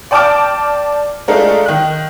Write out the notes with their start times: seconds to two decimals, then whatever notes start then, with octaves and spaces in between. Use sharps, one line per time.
0.11 D5 G5 A5 D6 F6 D7
1.28 G#3 A3 D4 D#4 F4 A#4
1.66 D#3 F#6